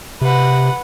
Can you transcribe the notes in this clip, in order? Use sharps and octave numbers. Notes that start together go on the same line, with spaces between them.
C3 B4 F#5